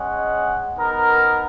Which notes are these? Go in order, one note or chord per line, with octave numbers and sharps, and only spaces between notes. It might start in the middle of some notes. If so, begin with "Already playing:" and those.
Already playing: G#3 C#4 G#4 D#5 F#5
B3 D#4 A#4